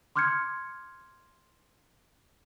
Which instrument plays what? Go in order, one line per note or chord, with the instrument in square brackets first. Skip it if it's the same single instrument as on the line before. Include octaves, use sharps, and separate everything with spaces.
[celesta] C6 D6 F6 G6 G#6 C#7